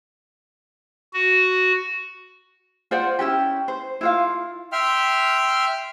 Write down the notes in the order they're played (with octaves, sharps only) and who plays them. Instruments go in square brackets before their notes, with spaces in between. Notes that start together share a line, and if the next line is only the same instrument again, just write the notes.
[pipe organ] F#4
[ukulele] F4 C5 D5 F#5
C#4 E4 F#4 G4
C5
E4 F4 F5
[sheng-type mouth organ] E5 G5 C6 F6